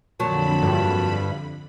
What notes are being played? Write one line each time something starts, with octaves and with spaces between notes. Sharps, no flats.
F2 A#2 D3 F#3 A5 B5
G2